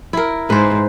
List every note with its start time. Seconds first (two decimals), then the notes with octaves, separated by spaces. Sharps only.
0.13 E4 A#4
0.50 G#2 B4 C5